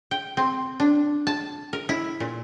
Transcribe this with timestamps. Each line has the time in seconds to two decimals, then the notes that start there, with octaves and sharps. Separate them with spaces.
0.11 G5
0.37 C4
0.80 D4
1.27 A5
1.73 A#4
1.89 E4
2.20 A#2